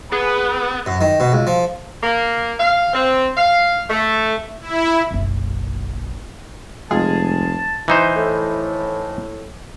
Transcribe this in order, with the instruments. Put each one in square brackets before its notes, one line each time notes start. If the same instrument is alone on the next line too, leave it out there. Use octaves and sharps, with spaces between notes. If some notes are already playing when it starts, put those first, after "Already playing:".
[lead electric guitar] B3 [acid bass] G#4 [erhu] B4
[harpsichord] F#2
D#3
B2
C#2
F3
[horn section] A#3
F5
C4
F5
A3
[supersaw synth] E4
[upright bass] F#1 B1
[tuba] F1 [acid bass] G#3 [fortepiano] F4 G#4 G#5 [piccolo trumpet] A5
[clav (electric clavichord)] E3 D#4 C5
[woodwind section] A2